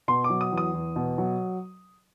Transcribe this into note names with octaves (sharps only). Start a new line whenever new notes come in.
B2 C6
D6
F#3
D#6
E2
D#6
E2
B2
F#3